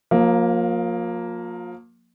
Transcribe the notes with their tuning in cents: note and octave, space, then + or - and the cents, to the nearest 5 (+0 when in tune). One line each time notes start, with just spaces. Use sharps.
F3 +35 A#3 +0